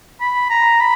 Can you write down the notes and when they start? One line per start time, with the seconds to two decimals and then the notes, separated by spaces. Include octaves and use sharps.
0.21 B5
0.50 A#5
0.80 B5